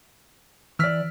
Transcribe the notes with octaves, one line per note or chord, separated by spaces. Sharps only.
E3 D5 E6 F6 B6